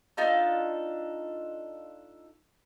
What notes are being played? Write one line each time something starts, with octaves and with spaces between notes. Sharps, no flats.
D4 D#4 F4 A4